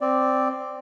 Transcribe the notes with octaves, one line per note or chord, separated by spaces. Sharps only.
C4 D5